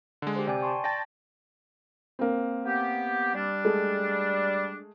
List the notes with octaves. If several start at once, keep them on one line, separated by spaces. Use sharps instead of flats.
D3 G#3
G4 C5
C3 D5 G5 G#5
A5 C6 C#6
D5 G5 A5 A6 A#6
A#3 C4
B3 G4
G3 D4
G#3 A3